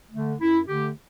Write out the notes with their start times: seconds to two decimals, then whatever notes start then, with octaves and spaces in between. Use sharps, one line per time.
0.11 D3 A3
0.39 F#2 E4
0.67 D3 A3 G4